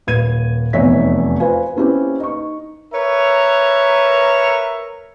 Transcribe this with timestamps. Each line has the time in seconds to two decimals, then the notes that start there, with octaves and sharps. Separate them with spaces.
0.07 D#1 B4 G#6 D#7
0.73 F1 E2 D#4 C#5 E5 B6
1.40 F4 B4 C5 F5 G#5
1.76 A#3 C4 C#4 E4 G4 B4
2.20 D#4 C#6
2.94 A#4 B4 C#5 E5 A#5